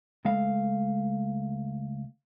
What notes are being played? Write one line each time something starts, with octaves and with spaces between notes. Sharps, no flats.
C#2 G#3 A3 F5